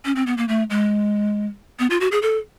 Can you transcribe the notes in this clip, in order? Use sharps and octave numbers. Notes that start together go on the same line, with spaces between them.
C#4
C4
B3
A#3
A3
G#3
B3
F4
F#4
G#4
A4